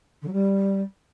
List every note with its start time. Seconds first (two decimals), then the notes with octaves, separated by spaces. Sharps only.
0.22 D3
0.27 F#3
0.32 G3